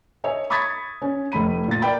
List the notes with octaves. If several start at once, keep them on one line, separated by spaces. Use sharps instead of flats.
C#5 D#5 E5 G#5
B5 C#6 D#6 G#6 A6 B6
C#4
F1 A3 B5 D#7
A#2 A6
A#4 D5 G5 B5